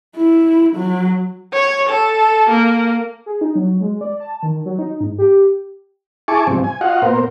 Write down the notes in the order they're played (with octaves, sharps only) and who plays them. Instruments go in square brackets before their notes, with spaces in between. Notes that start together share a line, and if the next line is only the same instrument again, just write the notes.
[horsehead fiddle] E4
F#3
[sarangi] C#5
A4
A#3
[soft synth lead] G#4
D#4
F#3
G#3
D5
A5
D#3
F#3
D#4
G#2
G4
[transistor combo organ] E4 G#4 G#5 A5 C#6 D6
G#2 C3 F3 G3 C4
G#5
F4 F#4 D#5 F5 F#5
A#2 B3 A#4 C5